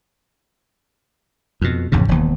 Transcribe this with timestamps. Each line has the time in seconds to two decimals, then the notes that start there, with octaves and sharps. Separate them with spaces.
1.61 F2 B2
1.92 A1 F2 G#2 C#3
2.08 E1 D#2